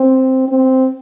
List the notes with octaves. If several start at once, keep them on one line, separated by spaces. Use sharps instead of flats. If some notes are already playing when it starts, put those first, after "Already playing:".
Already playing: C4
C4